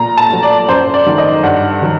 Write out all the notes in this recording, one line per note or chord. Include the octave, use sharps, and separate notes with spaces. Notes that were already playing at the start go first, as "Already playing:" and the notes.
Already playing: A#2 A#5
A5
F#3 A3
D5
F#2 C5
D5
D#3 F#3 A3
D#5
G2 F#5
D#3 F#3